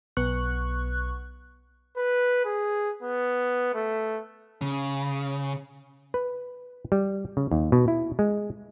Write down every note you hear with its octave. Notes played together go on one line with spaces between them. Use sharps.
B1 B3 C#6 F#6
B4
G#4
B3
A3
C#3
B4
G3
C#3
D#2
B2
E4
G#3